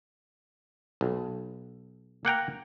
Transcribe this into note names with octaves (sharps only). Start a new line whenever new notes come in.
B1
A#3 F#5 G5 A#5